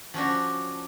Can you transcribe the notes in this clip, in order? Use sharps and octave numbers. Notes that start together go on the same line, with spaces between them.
F3 C#4 D4 F#4